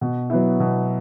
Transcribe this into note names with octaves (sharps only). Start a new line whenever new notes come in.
B2
F#3 B3 E4
B2